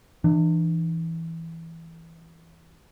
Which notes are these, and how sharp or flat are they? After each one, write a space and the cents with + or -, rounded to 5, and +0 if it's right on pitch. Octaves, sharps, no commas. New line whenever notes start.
E3 +0 D4 +40